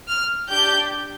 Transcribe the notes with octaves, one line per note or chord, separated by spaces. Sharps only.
F6
D4 G4 G6